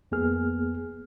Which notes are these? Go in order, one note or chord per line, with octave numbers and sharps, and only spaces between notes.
F2 A#3 B3 G#4 F6